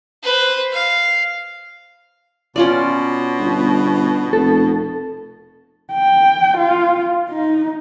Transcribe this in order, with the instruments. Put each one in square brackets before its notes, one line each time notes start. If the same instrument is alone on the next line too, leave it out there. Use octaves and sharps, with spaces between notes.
[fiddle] B4 C5
F5
[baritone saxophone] B2 [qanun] C#4 F4 D5
[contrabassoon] G1
[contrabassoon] F1 [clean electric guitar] A4
[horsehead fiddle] G5
F4
D#4